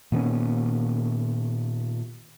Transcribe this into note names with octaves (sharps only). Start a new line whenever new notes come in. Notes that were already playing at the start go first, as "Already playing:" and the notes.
A#2 D#3 B3 C#4